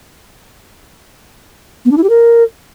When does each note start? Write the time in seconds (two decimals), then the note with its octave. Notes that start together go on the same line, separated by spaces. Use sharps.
1.85 B3
1.91 D4
1.97 E4
2.03 G4
2.10 A#4